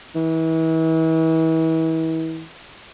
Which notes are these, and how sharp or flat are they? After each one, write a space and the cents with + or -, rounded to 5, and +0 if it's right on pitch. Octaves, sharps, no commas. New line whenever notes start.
E3 -35